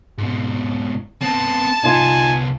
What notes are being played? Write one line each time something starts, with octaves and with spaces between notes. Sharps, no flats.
G#2 B2
B3 C4 A5
C2 B3 D#4 F4 G#5